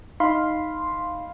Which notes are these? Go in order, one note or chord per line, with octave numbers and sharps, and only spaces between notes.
D#4 F5 B5 C6